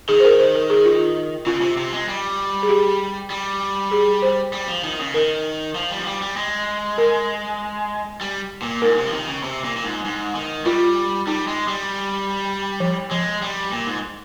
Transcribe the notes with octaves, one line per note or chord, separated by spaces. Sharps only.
D#3 G#4
C5
A#4
C5
A#4
G#4
F4
C#3 F4
C3
C3
G#3
G3
G#4
G4
G3
G#4
C5
G3
F3
D#3
C#3
D#3 A#4
F3
G3
F3
G3
G3
G#3
A#4
G3
A#2
G#2 A#4
C3
F3
D#3
C#3
C3
A#2
A#2
G#2
G#2
D#3
G3 F4
G3 D#4
G#3
G3
F3
F3 G#3
G3
A#2
G#2